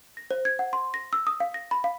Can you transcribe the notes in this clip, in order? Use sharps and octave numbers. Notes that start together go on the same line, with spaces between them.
A#6
C5
G#6
F#5
C6
A#6
E6
D#6
F5
A#6
B5
F5